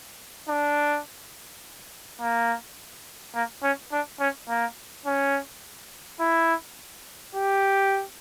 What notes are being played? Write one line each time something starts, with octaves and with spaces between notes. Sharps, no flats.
D4
A#3
A#3
C#4
D4
C#4
A#3
C#4
E4
G4